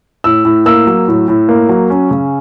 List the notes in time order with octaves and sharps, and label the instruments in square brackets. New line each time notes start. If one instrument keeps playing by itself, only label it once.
[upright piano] A2 E6
A2
A#3 E6
F#3
A2
A2
A#3
F#3
C#4
C#3